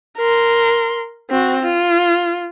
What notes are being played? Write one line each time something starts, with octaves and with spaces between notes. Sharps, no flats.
A#4 C6
C4 F#4
F4